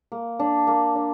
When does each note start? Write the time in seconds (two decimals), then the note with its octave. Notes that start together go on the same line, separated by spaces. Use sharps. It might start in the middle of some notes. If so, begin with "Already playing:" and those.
0.12 A#3
0.39 D4
0.67 A#3
0.95 D4